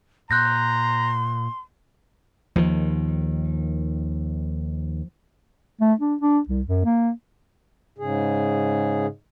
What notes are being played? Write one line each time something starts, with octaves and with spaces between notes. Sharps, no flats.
A#2 A#5 C6 F#6 G6 A#6
D#2 D#3 F3
A3
D4
D4
C2
F#2
A#3
G#2 C#3 G#4